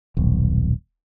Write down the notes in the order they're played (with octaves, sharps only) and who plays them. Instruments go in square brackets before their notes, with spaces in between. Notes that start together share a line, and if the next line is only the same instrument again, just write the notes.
[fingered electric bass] D#1 B1